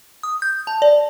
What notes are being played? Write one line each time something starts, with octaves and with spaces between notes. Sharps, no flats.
D#6
G6
A5
D5